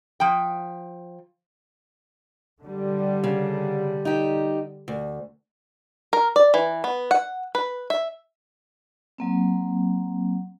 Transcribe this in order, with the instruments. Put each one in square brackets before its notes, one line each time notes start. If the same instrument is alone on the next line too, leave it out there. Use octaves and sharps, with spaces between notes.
[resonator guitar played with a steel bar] F3 G5
[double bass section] D3 G3
[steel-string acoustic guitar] C#3
D#4 G4
D2
[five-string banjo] A#4
D5
E3
B3
F#5
B4
E5
[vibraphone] F#3 A#3 C4